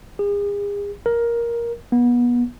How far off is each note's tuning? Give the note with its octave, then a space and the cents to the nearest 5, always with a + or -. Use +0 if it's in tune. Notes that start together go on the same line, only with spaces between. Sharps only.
G#4 -40
A#4 +10
B3 -30